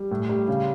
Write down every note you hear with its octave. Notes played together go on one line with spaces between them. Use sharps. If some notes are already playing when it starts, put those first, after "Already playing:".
Already playing: G3
A2
G3
C#3